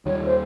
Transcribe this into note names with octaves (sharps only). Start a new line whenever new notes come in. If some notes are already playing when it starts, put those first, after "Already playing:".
D#2 D#3 G3 C#5
C5